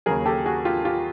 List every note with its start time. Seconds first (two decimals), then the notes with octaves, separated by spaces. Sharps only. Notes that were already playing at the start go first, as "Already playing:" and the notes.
0.06 D#2 C#3 F#3 G#4 A#4
0.26 G4 A4
0.46 F#4 G#4
0.65 F4 G4
0.85 F4 G4